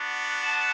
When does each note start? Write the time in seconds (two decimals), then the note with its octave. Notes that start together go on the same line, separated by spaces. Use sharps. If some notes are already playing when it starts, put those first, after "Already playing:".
Already playing: B3 D4 F#4
0.42 F#5 A5